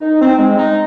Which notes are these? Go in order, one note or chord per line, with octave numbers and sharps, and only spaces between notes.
D#4
C4
G#3
D#4